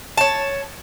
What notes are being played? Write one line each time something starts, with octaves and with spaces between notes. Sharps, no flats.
C#5 A5